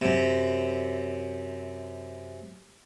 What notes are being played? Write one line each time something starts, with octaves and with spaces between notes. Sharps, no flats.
F#2 C3